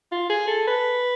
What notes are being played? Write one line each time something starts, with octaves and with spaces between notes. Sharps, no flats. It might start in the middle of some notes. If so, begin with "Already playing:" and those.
F4
G#4
A4
B4